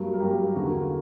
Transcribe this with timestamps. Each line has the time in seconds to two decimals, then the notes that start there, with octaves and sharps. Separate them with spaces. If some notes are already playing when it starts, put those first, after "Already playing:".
Already playing: G2 F#3 A#3
0.14 A#4
0.20 G2 F#3 A#3 G4
0.52 G4
0.55 E2 D3 A#3 F#4